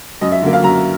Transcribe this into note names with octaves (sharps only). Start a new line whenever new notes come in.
F#2 D#5
E5
D3 F#3 A#3
F5
F#2 A#5